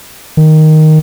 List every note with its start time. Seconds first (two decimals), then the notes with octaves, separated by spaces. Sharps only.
0.37 D#3